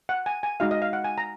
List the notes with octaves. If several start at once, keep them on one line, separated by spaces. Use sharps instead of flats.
F#5
G#5
G#5
G#3 D#4 F#4 F5
D#5
F5
F#5
G#5
A#5